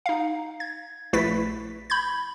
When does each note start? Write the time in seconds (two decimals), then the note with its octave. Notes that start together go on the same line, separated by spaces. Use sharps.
0.06 D#4 F5
0.60 G#6
1.13 A#1 A3 E4 B4 A6 B6
1.90 B5 G6 G#6